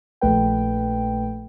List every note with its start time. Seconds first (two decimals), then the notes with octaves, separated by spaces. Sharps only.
0.21 A#1 A3 B4 G5